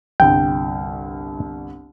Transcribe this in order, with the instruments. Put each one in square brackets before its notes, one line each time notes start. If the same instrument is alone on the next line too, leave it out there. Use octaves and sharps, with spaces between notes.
[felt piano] G1 C2 [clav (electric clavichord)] G5